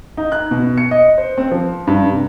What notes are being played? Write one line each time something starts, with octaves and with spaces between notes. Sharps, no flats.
D#4
F#6
B2
C#7
D#5
C5
C4
F3
G2
C3